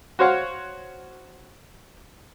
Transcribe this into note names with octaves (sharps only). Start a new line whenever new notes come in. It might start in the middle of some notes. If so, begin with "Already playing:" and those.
F#4 C5 C#5 F5 F#5